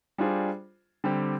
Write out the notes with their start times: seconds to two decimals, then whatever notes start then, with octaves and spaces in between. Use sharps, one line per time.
0.18 G3 D4 F4 G#4 C5
1.04 D3 G3 C4 G4